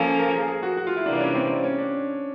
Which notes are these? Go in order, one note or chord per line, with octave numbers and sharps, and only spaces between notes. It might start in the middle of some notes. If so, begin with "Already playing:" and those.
Already playing: F3 A#3 C#4 A4
A#4
G#4
G#4
F#4
F#4
F4
E4
C3 E3 G3 A#3 D4
C#4
C4
C#4
D4